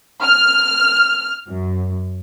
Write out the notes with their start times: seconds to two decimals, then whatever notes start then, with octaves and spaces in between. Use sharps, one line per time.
0.22 F6
1.48 F#2